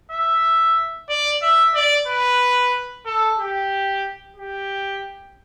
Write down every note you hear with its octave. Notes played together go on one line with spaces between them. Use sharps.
E5
D5
E5
D5
B4
A4
G4
G4